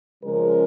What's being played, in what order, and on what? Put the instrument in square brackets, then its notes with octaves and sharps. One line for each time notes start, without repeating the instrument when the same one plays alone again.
[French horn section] C#3 F3 G#3 C#4 A#4